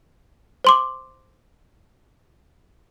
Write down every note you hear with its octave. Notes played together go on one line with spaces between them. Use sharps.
C5 C6 D6